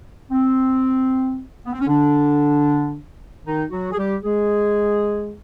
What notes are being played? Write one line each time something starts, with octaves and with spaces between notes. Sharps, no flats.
C4
B3
C4
C#4
D3 D4
D#3 D#4
F#3 F#4
G#4
G3 G4
G#3 G#4